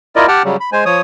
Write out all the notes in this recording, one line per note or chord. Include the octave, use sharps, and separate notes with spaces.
E4 F4 A#4 D5 D#5
G4 F#5 G5 A5 F6
C#3 F#3 G3
B5
G#3 C5 G#5
F3 C#5 D#6